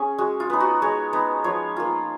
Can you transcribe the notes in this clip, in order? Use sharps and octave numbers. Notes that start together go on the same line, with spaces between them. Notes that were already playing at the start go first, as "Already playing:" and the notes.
Already playing: C#4 G#4
G#3 F#4
F4
B3 D#4
F#4
G#3 C#5
B3 D#4
F3 C#5
A#3 F4